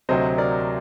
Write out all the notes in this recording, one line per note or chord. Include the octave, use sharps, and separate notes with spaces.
D2 C3 F#3 C5 D#5
A#4 D5